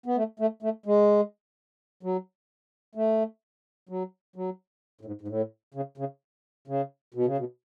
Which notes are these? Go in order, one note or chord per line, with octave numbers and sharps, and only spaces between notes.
B3
A3
A3
A3
G#3
F#3
A3
F#3
F#3
A2
G#2
G#2
A2
C#3
C#3
C#3
B2
C#3
B2